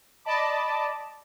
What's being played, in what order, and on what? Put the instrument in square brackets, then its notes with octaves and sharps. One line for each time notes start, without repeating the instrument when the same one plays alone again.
[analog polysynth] D5 D#5 A5 B5 D6